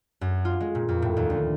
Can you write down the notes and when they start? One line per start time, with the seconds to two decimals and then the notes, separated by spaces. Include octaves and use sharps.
0.21 F#2
0.45 F4
0.60 G#3
0.75 A#2
0.89 F2
1.02 A2
1.17 D#2
1.30 D2